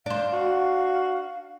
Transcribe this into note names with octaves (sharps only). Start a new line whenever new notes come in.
D4 C5 F5
F#4